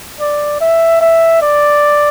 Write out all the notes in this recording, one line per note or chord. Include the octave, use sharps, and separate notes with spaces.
D5
E5
E5
D5